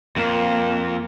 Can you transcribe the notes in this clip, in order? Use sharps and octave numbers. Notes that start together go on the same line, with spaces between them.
F2 A#3